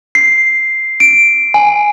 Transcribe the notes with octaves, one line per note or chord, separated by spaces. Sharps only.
C7
D7
G#5